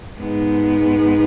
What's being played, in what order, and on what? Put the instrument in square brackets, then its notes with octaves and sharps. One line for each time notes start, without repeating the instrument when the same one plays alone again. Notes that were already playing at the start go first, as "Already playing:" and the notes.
[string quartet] G#2 G#3 B3 D#4